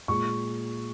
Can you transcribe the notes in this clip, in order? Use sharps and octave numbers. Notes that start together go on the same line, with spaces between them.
A#2 G#3 C#6